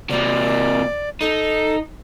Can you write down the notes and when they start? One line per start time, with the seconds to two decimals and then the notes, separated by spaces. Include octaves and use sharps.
0.10 C3 A#3 D5
1.21 D#4 A4